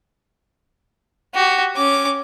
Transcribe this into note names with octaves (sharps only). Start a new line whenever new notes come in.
F#4 G4
C#4 D6